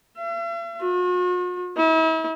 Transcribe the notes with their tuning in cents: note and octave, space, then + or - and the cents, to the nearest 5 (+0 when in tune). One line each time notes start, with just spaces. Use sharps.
E5 +45
F#4 -45
E4 -40